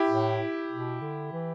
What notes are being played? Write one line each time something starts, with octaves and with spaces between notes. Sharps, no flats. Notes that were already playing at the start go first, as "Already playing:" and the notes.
Already playing: E4 G4
A2
B2
D3
E3